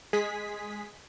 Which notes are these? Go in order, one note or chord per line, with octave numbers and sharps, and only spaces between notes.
G#3 G#4 B6